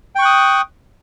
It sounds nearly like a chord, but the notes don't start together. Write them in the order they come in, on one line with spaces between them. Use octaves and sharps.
G5 C#6 F#6 D#6